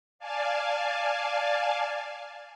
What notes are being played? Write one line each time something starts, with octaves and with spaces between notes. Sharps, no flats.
D5 F5 G#5 A5